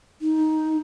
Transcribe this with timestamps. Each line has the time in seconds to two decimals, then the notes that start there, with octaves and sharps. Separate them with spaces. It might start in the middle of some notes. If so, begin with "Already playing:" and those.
0.21 D#4